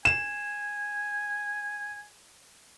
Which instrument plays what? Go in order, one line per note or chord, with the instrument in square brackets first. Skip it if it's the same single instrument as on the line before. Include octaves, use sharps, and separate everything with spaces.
[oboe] G#5 [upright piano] E7